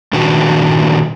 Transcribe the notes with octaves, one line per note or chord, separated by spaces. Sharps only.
A#2 D#3 D4 F#4 B4